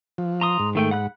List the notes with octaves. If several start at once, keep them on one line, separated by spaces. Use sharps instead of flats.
F3
A#5 C6 D#6
G#2
D#3 A3 G5
F#5 B5 F#6